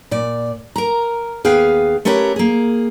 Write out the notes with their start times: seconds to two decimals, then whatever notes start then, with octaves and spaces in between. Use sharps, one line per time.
0.11 A#2 D5
0.76 A#4 A#5
1.44 D#2 B3 G#4 B4 F5 G5
2.05 A3 C#4 G4 A#4 B4 C#5
2.36 A#3 G#4